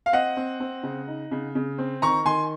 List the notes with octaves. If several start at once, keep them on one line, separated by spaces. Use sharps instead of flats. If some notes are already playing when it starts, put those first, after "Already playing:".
F5
C4 D#5 F#5
C4
C4
C#3
D#4
C#3
C#3
C4
D#3 A#5 C#6
D#3 G#5 C6